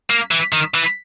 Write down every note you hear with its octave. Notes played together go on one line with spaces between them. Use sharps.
A#3
E3
D#3
E3